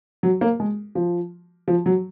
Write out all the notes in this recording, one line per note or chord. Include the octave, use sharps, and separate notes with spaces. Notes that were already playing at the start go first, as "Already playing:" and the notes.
F#3
A#3
G#3
F3
F3
F#3